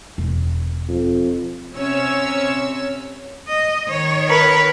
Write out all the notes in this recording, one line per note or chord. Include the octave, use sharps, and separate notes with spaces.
E1
F2
C3 C#4 C#5 E6
D#5
D#3 C#5
A#4 B4